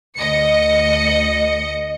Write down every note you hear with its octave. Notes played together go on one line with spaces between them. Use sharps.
D2 D#5 C#7